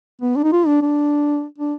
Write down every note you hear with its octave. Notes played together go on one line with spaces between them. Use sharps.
B3
D4
D#4
F4
D4
D4
D4